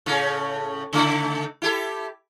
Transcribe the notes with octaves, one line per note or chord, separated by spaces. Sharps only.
A2 C#3 C#4
C#3 A3 E4
E4 G4 A4